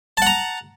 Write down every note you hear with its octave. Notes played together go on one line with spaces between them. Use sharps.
F#5 A5 A#5